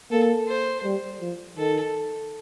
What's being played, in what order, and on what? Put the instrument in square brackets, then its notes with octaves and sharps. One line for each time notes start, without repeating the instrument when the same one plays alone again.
[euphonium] A#3 [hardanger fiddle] A4
[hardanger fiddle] C5
[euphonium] G3
F3
[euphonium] D#3 [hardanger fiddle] A4